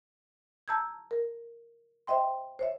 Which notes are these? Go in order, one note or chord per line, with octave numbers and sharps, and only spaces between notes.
A5 A#5 E6 G6 G#6
A#4
C5 D#5 E5 G5 C6
C5 C#5 E5